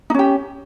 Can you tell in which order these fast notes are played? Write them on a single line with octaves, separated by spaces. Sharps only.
D#4 C#4 G4